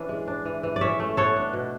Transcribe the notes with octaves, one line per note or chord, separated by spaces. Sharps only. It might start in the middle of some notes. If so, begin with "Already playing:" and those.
Already playing: E3 C#4 D4
G#3
D4
E3
E3
D5
C#4 C#5 E5
A3
B3 A4 C#5
D4
B2